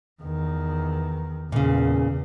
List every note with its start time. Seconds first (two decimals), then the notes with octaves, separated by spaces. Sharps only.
0.22 E2 D#3
1.52 E2 A#2 C#3